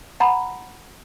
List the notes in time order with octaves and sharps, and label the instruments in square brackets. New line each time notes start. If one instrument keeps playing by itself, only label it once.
[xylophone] F#5 A#5 B5